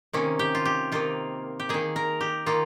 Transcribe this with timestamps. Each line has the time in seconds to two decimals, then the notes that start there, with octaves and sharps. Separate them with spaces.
0.13 C3 D#3 A#3 C#4
0.39 G4
0.55 F4
0.65 G4
0.92 C3 D#3 A#3 F4
1.60 G4
1.69 D#3 A#3 G#4
1.96 A#4
2.21 G4
2.46 D#3 A#3 F4